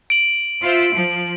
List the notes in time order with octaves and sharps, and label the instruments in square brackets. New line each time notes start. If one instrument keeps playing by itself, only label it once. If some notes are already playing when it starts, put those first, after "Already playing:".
[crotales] D7 F#7
[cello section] F4 C5 E5
F3